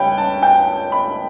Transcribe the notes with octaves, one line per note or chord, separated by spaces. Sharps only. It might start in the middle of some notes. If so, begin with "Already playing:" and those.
Already playing: C#2 G3 B4 C#5 G5
A5
G5
B5